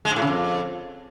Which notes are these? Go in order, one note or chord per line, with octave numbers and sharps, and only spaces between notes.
G#3
G#2
A2
C#3
F2